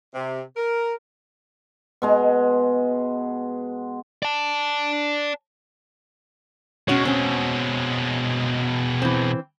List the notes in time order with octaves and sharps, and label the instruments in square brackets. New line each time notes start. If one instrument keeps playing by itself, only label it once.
[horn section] C3
A#4
[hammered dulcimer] B2 G#3 A#5
[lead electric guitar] D5 A5
[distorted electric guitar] B2 G#3 [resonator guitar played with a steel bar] C#4 F#4 C#5
[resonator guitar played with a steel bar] C4 C#4
E3 C4